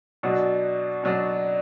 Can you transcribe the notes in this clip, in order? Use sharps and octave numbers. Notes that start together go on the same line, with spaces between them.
B2 F#3 D4 F#4 D5
B2 F#3 D4 F#4 D5